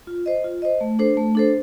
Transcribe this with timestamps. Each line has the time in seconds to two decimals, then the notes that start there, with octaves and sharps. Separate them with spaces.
0.07 F4
0.26 C5 D#5
0.44 F4
0.62 C5 D#5
0.81 A3
0.99 D4 A4 C5
1.17 A3
1.35 D4 A4 C5